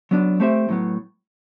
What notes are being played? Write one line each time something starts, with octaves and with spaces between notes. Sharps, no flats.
F#3 B3 D4
A3 C4 G4 C5 E5
A2 F#3 B3